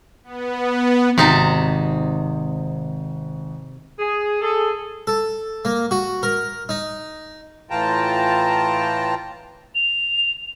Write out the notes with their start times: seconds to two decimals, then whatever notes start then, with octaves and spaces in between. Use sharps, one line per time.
0.24 B3
1.18 G#1 C3 D#4 A5
3.99 G#4
4.41 G#4 A4
5.07 A4
5.65 A#3
5.91 F#4
6.23 A#4
6.69 D#4
7.70 A2 E3 F4 G5 A5 A#5
9.75 F7